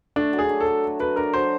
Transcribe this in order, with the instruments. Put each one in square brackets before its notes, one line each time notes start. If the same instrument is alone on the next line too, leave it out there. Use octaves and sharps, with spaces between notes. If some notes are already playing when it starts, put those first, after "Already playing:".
[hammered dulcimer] A3 [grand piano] D4
[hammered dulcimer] F#3
[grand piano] G#4
[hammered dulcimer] D4
[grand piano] A4
[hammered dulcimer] F#3
A3
[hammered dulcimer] F#3 [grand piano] B4
[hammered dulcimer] D4 [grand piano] A#4
[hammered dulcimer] F#3 [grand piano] C5